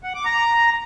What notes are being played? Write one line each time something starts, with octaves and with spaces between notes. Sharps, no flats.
F#5
D6
A#5